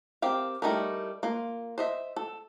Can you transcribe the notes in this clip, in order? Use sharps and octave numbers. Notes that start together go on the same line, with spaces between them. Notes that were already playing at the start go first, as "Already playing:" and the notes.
C4 G4 A#4 F5
G3 A3 D#4 E4 A#4
A#3 F4
C5 D#5 E5
A4